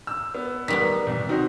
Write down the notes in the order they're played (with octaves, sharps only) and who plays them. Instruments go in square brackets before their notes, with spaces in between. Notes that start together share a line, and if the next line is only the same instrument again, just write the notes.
[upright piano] E6
B3
[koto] D#3 G3 B3 [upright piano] B6
[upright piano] C2
C4 D#4 F#4